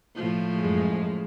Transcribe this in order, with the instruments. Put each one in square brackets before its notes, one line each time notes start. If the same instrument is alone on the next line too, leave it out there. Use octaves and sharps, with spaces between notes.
[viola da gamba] A2 F3
[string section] F#2 G#3